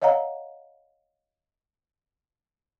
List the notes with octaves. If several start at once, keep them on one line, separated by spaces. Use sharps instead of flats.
C#5 D#5 F5 F#5 A#5